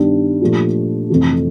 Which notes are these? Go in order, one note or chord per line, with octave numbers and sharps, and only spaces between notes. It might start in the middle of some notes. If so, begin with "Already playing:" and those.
Already playing: G2 D#3 G3 B3 D4
A#2 F3 A3 D4 G4
F2 C3 E3 A3